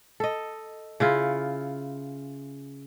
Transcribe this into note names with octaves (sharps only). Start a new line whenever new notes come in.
A4 D#5
C#3 E4 F4